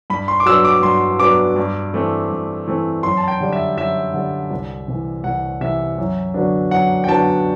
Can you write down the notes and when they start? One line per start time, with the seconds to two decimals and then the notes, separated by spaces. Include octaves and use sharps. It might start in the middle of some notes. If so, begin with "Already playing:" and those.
0.10 G2 B5
0.28 C6
0.40 D6
0.46 F#3 B3 D4 E6
0.64 D6
0.83 G2 C6
1.19 F#3 B3 D4 D6
1.56 G2
1.93 E3 A3 C4
2.30 G2
2.67 E3 A3 C4
3.03 F#2 C6
3.17 A5
3.28 G5
3.40 D3 G3
3.53 E5
3.77 F#2 E5
4.14 D3 G3
4.51 C2
4.88 C3 E3
5.24 C2 F#5
5.61 C3 E3 E5
5.98 F#2
6.34 D3 F#3 B3 D4
6.71 F#2 F#5
7.04 G5
7.08 D3 F#3 B3 D4 A5